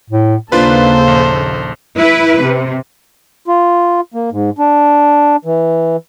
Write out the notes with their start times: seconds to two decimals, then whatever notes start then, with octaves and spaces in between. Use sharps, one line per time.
0.10 A2
0.52 D#2 C#3 A#3 D4 F4 A4 B4 C5
1.08 A#1
1.96 E4 B4
2.41 C3
3.48 F4
4.14 A#3
4.32 G#2
4.59 D4
5.45 E3